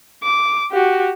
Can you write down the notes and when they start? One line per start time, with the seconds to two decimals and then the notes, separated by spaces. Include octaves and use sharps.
0.23 D6
0.71 F#4 G4